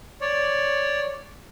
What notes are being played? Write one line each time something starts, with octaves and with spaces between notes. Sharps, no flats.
C#5 D5